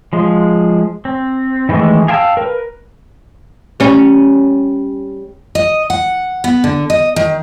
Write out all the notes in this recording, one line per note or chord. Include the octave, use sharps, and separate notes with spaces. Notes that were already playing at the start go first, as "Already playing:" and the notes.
F3 G#3
C4
D#3 E3 G#3 A3
G#4 F5 G5 A5 E6
A#4 B4
G3 C#4
D#5
F#5
B3
D3
D#5
D#3